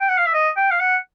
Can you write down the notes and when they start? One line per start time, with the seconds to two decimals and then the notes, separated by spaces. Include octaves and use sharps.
0.01 G5
0.09 F#5
0.18 F5
0.26 E5
0.34 D#5
0.57 G5
0.71 F5
0.80 F#5